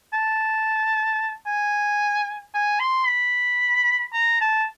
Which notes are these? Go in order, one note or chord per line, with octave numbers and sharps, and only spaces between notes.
A5
G#5
G#5
C6
B5
A#5
A5